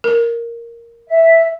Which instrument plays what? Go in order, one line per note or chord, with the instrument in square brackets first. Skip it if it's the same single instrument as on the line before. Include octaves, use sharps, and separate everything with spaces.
[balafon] A#4
[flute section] E5